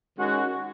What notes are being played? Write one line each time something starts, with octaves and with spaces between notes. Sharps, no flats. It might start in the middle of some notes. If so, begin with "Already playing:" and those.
D#3 G#3 C#4 F#4